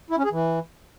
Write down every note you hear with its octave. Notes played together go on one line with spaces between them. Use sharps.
E4
C#4
G#4
E3